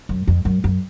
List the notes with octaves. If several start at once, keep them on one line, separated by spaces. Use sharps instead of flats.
F#2
F2
F#2
F#2